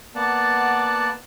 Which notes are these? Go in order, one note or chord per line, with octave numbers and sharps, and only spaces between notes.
A#3 B3 D5 F#5 A5